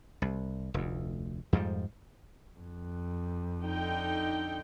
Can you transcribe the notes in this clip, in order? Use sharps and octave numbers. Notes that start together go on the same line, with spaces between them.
C2
F1 D2
F2 G#2 F3 G3
F2
D3 D#4 G5